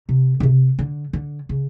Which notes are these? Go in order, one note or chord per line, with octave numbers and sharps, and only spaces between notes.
C3
C#3
C3
D3
D3
C#3